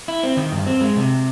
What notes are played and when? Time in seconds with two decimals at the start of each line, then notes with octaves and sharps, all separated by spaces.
0.08 E4
0.23 C4
0.37 D#3
0.52 G2
0.67 C4
0.81 G#3
0.96 C3